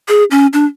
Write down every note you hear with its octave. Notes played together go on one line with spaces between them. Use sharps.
G#4
C#4
D4